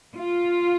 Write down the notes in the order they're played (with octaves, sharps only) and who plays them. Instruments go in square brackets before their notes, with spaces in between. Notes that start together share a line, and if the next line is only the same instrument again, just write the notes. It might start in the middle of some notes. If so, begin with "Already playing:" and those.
[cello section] F4